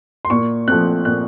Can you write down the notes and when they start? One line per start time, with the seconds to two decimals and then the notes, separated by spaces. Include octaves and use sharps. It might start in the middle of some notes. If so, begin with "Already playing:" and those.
0.25 C6
0.30 A#2 C#6
0.68 F3 A3 C4 F#6
1.05 A#2 F#6